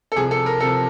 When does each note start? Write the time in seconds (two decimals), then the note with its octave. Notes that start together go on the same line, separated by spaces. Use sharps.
0.12 A4
0.16 C2 C3 F3 G#4
0.31 A4
0.46 A#4
0.60 C2 C3 F3 A4